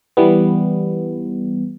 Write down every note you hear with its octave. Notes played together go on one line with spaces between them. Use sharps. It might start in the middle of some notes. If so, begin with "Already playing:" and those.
E3 G3 B3